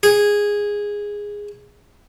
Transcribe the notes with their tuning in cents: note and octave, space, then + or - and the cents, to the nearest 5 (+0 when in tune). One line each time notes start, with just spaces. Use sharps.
G#4 -10